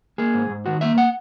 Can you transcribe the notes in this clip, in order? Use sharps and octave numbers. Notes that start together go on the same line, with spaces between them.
A#3 G#4
G#2
G#2
D#3 F#4
A#3 E5
F#5